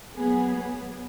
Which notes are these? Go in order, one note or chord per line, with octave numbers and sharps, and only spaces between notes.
F#3 B3 G#4